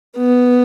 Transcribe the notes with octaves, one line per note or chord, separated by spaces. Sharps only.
B3